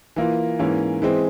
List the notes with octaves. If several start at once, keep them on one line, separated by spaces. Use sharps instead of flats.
E3 A#3 F4
G#2 E3 A#3 C#4
E3 G#3 C4